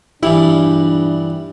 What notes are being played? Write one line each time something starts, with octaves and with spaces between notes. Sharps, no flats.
B1 G2 A#2 E3 G3 D4 E4